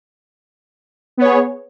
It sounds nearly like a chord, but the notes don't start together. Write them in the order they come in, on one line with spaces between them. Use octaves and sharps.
B3 C#5 G#4